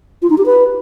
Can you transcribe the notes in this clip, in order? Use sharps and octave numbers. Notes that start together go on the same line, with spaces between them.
F4
D#4
G4
B4